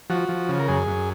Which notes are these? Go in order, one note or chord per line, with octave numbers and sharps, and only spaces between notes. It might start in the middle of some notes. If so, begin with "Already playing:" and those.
F3 F#4
F3
C#3
A#4
F#2 G#4
F#2